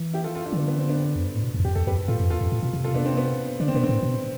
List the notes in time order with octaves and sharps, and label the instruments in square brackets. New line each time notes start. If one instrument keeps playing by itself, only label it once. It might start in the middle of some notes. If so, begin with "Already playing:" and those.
Already playing: [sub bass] E3
[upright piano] E4 G4
F4 A4
F4 A4
D4 F4
[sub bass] E3
[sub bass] D3 [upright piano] B3 D4
[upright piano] B3
C4
B3 D4
[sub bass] F2
G2
A2
B2
F2
E2
[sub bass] F2 [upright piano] G4
[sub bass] E2 [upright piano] A4
[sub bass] F2 [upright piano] G4 B4
[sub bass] G2
[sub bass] A2 [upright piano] F4 A4
[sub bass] F2
[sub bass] E2 [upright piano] F4 A4
[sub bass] F2
A2
B2
C3
[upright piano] F4 A4
B3 D4
C4
B3
[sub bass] D3 [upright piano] D4
[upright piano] C4
[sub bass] B2 [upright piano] B3
[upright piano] C4
[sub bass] A2
B2